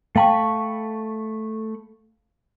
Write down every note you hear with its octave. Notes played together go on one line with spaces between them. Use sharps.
A3 F5 G5 A5 B5 C#6